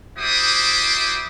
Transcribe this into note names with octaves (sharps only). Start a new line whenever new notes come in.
G3 E4 F#4 C5 D6 D#6